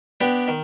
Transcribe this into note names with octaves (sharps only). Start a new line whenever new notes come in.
B3 D4 G4
D#3